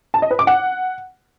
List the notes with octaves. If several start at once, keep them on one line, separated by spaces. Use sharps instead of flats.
A5
D#5
B4
D6
F#5